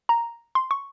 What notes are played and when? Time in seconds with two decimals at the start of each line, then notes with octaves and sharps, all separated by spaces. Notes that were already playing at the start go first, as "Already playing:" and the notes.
0.09 A#5
0.55 C6
0.71 C#6